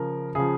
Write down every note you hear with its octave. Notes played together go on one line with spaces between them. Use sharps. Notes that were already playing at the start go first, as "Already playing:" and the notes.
Already playing: C#3 F3 A#4
C#3 F3 G#4